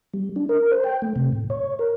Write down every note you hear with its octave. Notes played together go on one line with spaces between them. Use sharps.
G3
D4
A#4
C5
G5
A3
C3
A2
C#5
A#4